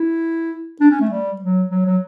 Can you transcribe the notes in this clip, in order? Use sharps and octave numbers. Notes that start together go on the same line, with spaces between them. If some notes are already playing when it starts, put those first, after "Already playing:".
Already playing: E4
D4
C#4
A3
G3
F#3
F#3
F#3